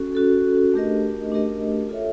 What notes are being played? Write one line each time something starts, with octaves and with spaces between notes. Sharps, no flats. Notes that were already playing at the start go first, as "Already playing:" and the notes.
Already playing: C#4 F#4 A4
C#4 F#4 A4
A3 D4 G4 A#4 D#5
A3 D4 G4 A#4 D#5
F4 A4 C#5 E5